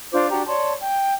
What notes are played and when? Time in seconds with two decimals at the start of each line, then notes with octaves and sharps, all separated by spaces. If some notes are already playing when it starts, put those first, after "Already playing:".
0.13 D4 F4 C5 D6
0.31 D4 F#4 G4 A#5
0.47 C#5 D5 A5 C6
0.81 G5